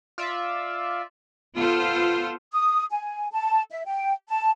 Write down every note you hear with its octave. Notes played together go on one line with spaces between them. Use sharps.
F4 D5 E5
B3 F4 A4 C5
D#6
G#5
A5
E5
G5
A5